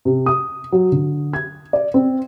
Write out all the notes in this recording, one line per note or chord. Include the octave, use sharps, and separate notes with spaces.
C3
D#6
F#3
D3
G#6
D5
C4